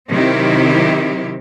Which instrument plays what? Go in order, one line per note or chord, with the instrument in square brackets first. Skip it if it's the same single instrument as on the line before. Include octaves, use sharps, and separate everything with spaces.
[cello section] C3 D#3 F#3 C4 E4 G4